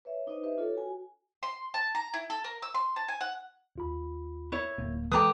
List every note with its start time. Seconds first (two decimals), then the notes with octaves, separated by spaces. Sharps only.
0.05 B4 C#5 E5
0.27 D4 D#4 B4 C5 D#5
0.43 G4 B4 D#5 E5
0.57 D4 F4 A4 C#5
0.74 F#4 G5 G#5
1.43 C6
1.74 A5
1.95 A#5
2.14 E4
2.30 A4
2.44 A#4
2.62 E6
2.75 C6
2.96 A5
3.08 G#5
3.21 F#5
3.76 D#2 F4 B5
4.52 E4 C#5
4.78 D1 A#3
5.11 E3 G#3 G4 A4 B4 A#5 D6 D#6